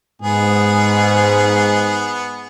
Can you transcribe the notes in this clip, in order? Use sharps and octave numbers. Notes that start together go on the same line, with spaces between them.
G#2 B3 G#4